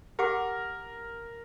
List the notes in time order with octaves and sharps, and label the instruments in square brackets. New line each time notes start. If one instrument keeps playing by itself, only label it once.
[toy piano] G4 F#5 D6 [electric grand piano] A#4